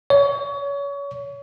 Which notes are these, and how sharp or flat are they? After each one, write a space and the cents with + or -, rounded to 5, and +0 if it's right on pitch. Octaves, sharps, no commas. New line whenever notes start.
C#5 +30